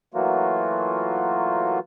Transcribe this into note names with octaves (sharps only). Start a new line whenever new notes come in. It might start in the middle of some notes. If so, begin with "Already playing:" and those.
E3 F#3 A3 A#3 F4 F#4